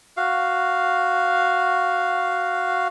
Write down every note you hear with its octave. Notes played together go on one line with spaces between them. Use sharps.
F#4 F5